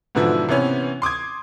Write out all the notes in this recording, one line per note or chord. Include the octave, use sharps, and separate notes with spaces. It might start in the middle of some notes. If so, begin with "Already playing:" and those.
G#2 B2 D3 E3 F3 E4
C3 E3 B3 C#4
C6 D6 D#6 G#6